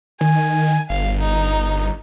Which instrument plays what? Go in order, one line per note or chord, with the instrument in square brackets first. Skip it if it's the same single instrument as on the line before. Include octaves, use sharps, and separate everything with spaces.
[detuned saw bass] D#3 [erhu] G#5
[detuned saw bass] G1 [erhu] F5
[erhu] D#4